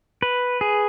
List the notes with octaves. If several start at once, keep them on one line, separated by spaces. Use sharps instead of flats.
B4
G#4